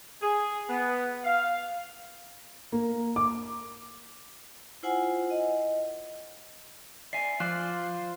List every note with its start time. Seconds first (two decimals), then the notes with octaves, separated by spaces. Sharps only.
0.22 G#4
0.70 B3
1.25 F5
2.72 A#3
3.16 D6
4.83 E4 F4 C5 F#5 G#5
5.30 D#5
7.13 D5 E5 G#5 C7
7.40 F3 F4 C5 D5 F#6